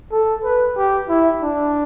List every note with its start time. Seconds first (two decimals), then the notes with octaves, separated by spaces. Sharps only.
0.12 A4
0.44 B4
0.77 G4
1.09 E4
1.42 D4